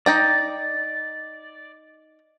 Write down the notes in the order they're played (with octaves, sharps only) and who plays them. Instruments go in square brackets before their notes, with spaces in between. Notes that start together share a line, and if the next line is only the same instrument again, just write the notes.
[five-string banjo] D#4 G5 A#5 [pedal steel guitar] D5